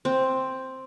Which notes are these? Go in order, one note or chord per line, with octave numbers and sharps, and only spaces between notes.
C4